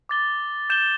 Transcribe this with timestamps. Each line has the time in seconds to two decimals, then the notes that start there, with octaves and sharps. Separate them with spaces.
0.09 D6 A6 G7
0.70 G6 E7 G7